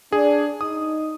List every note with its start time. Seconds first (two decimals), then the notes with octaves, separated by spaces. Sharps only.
0.12 D4 G#4
0.61 D#4 D#6